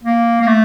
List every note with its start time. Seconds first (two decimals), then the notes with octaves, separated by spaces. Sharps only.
0.03 A#3
0.42 A#3
0.47 A3